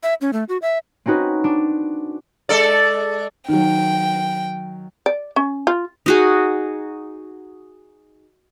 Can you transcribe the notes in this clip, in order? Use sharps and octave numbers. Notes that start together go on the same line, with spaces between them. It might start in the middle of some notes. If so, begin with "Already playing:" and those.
E5
C#4
A3
F#4
E5
C4 C#4 D#4 F#4 B4
D4
G#3 A4 D5
D#3 F#3 G5
D5
C#4
F4
D#4 F#4 G#4